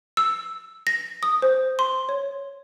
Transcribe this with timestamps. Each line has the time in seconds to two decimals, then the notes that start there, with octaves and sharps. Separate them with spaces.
0.17 E6
0.87 A#6
1.23 D#6
1.42 C5
1.79 C6
2.09 C#5